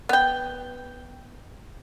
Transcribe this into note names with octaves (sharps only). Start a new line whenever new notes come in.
B3 G5